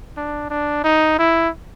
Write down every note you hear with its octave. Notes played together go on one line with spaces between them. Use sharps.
D4
D4
D#4
E4